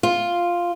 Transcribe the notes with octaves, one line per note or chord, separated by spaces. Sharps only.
F4